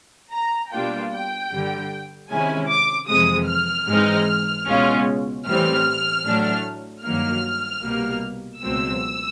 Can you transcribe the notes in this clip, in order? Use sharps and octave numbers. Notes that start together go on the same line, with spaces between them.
A#5
B2 G3 A#3 D4 F4 G5
G5
G2 D3 G3
C3 D#3 G#3 C#4 E4 G#5
D6
F2 C3 E3 G#3 D#6
F6
G#2 E3 G#3 C4 D#4
C#2 B2 G#3 C#4 F4
A2 E3 G3 C4 F6
A2 F#3 A3 D4
G2 D#3 F#3 A#3 F6
C2 B2 G3 A#3
C#2 B2 F#3 A3 C4 E6